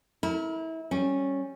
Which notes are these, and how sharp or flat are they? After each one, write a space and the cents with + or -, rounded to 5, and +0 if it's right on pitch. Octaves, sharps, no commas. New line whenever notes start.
E4 -30 A#4 +0
G3 -5 C#4 -10